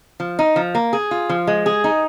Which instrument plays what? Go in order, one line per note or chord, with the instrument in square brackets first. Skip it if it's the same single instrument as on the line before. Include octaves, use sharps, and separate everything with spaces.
[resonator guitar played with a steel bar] F3
D#4
F3
A#3
G#4
F4
F3
G#3
G#4
D#4